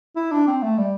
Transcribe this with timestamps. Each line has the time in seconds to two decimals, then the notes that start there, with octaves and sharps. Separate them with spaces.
0.16 E4
0.32 D4
0.48 C4
0.63 A3
0.78 G3